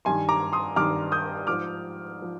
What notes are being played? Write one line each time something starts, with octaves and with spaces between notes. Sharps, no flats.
G2 D#3 G#5 C6
A#5 D6
C6 D#6
G2 D#3 D6 F6
D#6 G6
G#2 F3 D6 F6
F3